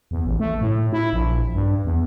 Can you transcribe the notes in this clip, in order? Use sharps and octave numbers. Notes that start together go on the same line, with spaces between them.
E2
A1
A3
A2
E4
A#1
G2
E2